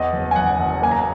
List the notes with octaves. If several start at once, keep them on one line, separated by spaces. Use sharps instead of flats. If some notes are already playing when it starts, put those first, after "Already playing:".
Already playing: E2 D#5
F#1
G#5
F#1 F#5
F#1
A#3 G#5
A#5
G#5